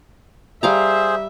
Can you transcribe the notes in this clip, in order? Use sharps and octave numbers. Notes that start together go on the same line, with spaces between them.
G3 G#4 C5 E5 F5 A#5